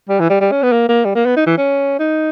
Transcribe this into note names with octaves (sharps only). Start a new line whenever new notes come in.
G3
E3
G3
G3
C#4
B3
A#3
A#3
G3
A#3
B3
D#4
E3
C#4
D#4